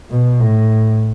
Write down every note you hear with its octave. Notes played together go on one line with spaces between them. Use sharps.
B2
A2